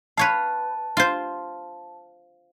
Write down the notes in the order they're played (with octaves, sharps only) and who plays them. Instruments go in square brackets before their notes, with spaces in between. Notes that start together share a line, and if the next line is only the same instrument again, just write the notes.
[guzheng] B4 C#5 F5 [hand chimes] A5
[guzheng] F4 C5